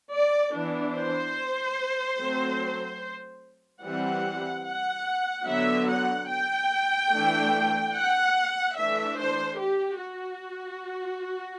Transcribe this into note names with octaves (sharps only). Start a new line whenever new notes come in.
D5
E3 B3 D4
C5
F#3 A3 C4
E3 G3 C4 F#5
F#5
D3 F#3 B3 E5
F#5
G5
E3 A3 D4
F#5
E3 A3 D4 E5
C5
G4
F#4